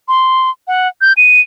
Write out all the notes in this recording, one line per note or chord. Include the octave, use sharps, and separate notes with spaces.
C6
F#5
G6
D#7